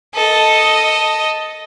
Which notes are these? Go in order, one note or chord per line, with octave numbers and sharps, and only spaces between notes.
A4 D#5